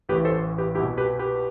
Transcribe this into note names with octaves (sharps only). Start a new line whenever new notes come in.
A1 A2 E3 G4 B4
A4 C5
G4 B4
C2 B2 E4 G4
G4 B4
G4 B4